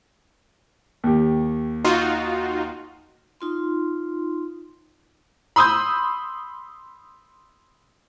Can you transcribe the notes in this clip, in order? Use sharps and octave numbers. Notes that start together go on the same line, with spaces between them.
D#2 G4
D#4 F4 F#4
D#4 F4 C6
B5 C6 D#6 E6 G6